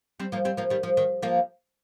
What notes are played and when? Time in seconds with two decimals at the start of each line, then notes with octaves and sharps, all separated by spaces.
0.20 G3 C4
0.32 F3 A#3
0.45 G3 C4
0.57 F3 A#3
0.70 D#3 G3
0.83 F3
0.97 D#3
1.22 F3 A#3